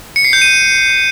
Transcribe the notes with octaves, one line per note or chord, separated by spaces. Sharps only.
C#7
C7
G6
D#7